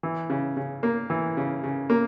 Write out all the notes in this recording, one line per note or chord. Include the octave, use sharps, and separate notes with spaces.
E3
C#3
C#3
A#3
E3
C#3
C#3
A#3